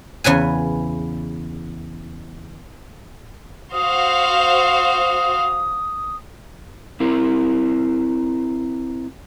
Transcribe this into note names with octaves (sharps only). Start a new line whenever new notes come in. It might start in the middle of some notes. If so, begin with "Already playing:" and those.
E2 C#3 B4 G#5
F#4 C5 F5 D#6
C4 E4 A#4